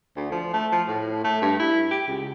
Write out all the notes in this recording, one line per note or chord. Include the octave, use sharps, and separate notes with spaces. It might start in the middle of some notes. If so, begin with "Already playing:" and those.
D2
F3
A3
F3
A2
A3
G2
E4
G4
C#2